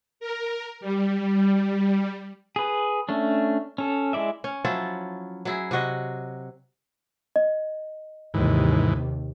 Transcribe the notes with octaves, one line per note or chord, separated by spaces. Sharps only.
A#4
G3
G#4 B4
A3 C#4 D4
C#4 A4
G#3 E4 D5 E5
C#4
F3 F#3 E4 F4
F#3 E4 G#4
C3 F#3 F#4 D#5
D#5
D#2 G#2 C3 E3